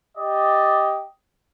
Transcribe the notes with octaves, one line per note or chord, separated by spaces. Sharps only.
G4 D5 D#5